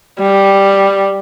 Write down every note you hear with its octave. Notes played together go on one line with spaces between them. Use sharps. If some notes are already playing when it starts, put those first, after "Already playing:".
G3